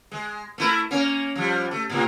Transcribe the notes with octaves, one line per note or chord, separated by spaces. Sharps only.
G#3
A3 E4 A#4
A#3 C#4
F3 G3
A3
A2 C3